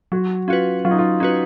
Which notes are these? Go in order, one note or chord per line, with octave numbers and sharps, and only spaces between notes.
F#3 F#4
C#4 F4 F#4 B4
F#3 F4
D#4
F4
C#4 D#4 F#4 B4